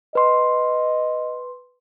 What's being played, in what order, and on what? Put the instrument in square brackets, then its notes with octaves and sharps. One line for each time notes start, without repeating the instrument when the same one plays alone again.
[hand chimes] B4 C6 [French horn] D#5